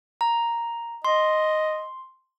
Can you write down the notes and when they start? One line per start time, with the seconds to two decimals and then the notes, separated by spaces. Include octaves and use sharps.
0.21 A#5
1.05 D#5 C6